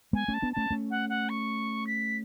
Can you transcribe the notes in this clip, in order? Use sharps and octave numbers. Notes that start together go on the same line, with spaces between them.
G#3 B3 G#5
A3 C#4 A5
B3 D4
A3 C#4 A5
A3 C#4
F#5
F#5
C#6
B6